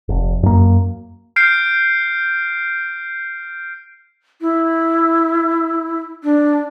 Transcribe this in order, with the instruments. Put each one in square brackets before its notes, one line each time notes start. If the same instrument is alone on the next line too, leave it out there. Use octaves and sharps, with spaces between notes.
[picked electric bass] F1
F#2 A#3
[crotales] F6 G6 C7 D7
[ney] E4
D4